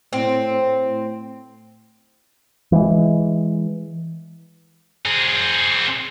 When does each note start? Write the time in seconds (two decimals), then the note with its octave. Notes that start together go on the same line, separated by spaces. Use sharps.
0.13 A2 C4
2.72 E3 G#3
5.06 C4 G#4